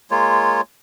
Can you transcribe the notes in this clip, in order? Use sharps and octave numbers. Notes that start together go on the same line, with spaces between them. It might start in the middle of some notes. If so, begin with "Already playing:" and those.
G#3 A#3 F4 C#5